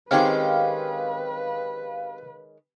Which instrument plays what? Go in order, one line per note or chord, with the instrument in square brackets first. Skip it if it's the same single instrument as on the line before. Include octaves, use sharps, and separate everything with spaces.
[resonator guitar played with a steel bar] D#3 G#3 C#4 [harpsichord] C4 G4 [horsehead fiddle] B4 [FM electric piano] F5